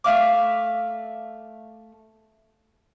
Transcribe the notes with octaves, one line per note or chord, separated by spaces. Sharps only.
A3 E5 F5 D6